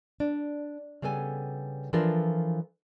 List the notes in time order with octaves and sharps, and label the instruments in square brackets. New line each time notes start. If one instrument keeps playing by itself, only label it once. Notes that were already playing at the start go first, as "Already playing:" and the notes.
[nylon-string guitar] D4
C#3 G3 B3 A4 G#5
E3 F3 D4 F4 A4 A#4